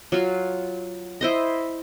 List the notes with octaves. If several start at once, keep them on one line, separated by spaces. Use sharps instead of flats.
F#3 F4
E4 C5 D#5